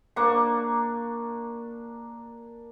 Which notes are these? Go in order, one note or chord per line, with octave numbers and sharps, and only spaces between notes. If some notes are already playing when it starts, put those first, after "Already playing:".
A#3 D4 C#6